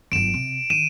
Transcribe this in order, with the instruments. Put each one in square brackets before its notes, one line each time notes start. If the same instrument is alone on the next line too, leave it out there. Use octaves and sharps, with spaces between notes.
[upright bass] G1 F#2 [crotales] D7 E7
[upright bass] C3
[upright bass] D#3 [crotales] D#7 E7